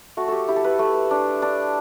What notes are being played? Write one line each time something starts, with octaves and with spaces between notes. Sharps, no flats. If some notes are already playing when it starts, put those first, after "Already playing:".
A3 F#4
G4 A4
E4 G4
A4
B4
A3
D4
D4